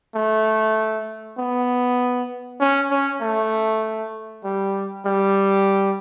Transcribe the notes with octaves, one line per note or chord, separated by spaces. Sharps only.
A3
B3
C#4
C#4
A3
G3
G3